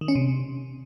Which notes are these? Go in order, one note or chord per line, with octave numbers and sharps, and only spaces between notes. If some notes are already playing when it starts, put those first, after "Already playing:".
D#3
C#4
C3